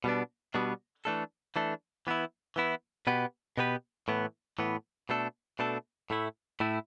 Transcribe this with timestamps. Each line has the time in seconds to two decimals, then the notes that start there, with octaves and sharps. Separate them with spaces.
0.04 B2 G3 B3 D4
0.54 B2 G3 B3 D4
1.05 E3 A3 D4 A4
1.56 E3 A3 D4 A4
2.07 E3 B3 E4
2.56 E3 B3 E4
3.07 B2 B3 G4 B4
3.57 B2 B3 G4 B4
4.08 A2 E3 B3
4.59 A2 E3 B3
5.09 B2 A3 D4 A4
5.59 B2 A3 D4 A4
6.10 A2 A3 E4
6.60 A2 A3 E4